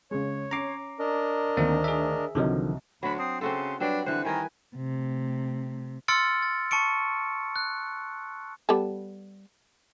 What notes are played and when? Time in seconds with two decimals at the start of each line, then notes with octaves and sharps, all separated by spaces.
0.11 C#3 G#3 C#5
0.51 C#4 A#5 D6 C7
0.99 D4 A#4 D#5
1.57 D2 D#3 A#3 C4
1.84 G#4 E5
2.35 C2 D3 D#3 F3 F#3 D#5
3.03 D2 F#3 D4 B5
3.19 C4 D#6
3.41 C#3 C4 F#4 A4 C6
3.80 F#3 G3 C4 D4 B4
4.06 D3 E3 C5 F#6
4.25 D#3 G3 A#4 B4 G#5
4.76 C3 A3
6.08 C6 E6 F6 A6 C#7 D7
6.43 A6
6.71 A5 C#6 C#7 D7
7.56 F#6
8.69 G3 B3 A4